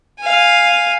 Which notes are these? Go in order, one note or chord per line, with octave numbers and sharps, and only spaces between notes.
F5 G#5